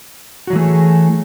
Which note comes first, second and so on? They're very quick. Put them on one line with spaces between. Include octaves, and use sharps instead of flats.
F#4 F#3 E3 A3 G#4